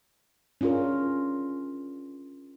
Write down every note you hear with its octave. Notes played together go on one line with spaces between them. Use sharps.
C#4 D4 F4 G#4 A#4